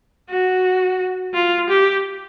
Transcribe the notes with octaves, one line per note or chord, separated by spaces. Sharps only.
F#4
F4
G4